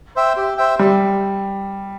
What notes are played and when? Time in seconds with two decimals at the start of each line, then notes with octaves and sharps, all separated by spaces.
0.16 C5 E5 G5
0.37 G4
0.58 C5 E5 G5
0.79 G3 G4